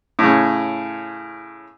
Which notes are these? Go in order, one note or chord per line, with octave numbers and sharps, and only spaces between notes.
A2 C#3